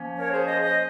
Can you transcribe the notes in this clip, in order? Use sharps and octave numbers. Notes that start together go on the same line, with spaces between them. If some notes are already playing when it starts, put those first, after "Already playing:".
Already playing: F3 A#3 C#4
A#4 C#5
G#4 C5
C5 D#5
C5 D#5